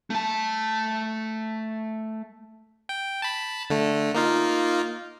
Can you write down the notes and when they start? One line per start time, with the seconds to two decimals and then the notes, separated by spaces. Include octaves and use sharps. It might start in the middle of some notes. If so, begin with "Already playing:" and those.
0.10 A3 A5
2.89 G5
3.22 A5 B5
3.70 D3 A3
4.14 A#3 D#4 F4